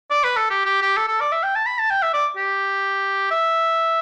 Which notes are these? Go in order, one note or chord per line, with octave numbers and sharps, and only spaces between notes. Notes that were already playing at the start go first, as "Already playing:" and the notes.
D5
B4
A4
G4
G4
G4
A4
A4
D5
E5
G5
A5
B5
A5
G5
E5
D5
G4
E5